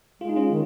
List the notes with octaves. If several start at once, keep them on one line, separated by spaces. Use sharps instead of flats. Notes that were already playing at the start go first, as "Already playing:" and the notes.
G#3 F4
D#4
C#4 F4
D#3